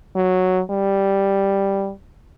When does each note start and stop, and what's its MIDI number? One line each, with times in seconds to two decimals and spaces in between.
0.16 0.61 54
0.71 1.92 55